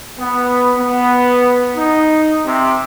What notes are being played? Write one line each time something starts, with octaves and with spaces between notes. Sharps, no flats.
B3
B3
D#4
C3